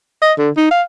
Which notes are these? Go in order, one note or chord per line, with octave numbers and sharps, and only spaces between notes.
D#5
D3
D#4
F5